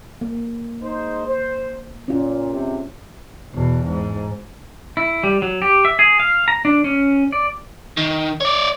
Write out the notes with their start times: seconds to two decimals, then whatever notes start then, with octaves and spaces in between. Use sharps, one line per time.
0.21 A#3
0.82 G#2 D#4 C5
1.28 C5
2.08 A#2 C#4 F4
2.52 G#2 C3
3.54 E2 B2
3.86 G#2
4.97 E4
5.24 G3
5.42 F#3
5.62 G4
5.85 E5
5.99 G#4
6.20 F5
6.48 A#5
6.65 D4
6.84 C#4
7.32 D5
7.97 D#3
8.41 C#5 D5